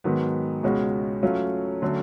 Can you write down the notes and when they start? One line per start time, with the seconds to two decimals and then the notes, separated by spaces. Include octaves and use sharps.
0.04 G#2 D#3 F#3 B3
0.63 C#2 B2 G#3 C#4 F#4
1.22 F#3 A3 C#4 F4
1.82 D3 F#3 A3 C#4